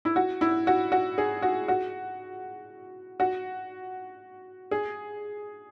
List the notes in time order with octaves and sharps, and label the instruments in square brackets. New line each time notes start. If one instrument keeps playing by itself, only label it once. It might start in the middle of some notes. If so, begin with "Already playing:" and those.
[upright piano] E4
F#4
E4
F#4
F#4
G#4
F#4
F#4
F#4
G#4